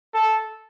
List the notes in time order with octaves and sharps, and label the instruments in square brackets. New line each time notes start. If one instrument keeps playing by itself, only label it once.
[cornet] A4